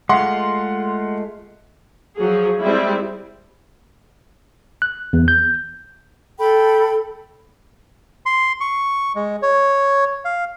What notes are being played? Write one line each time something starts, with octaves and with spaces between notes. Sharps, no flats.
G#3 A3 F4 F#5 C6
F3 F#3 G#4
G3 G#3 C4 E4
F#6
E2
G6
A4 G5 B5
C6
C#6
G#3
C#5
F5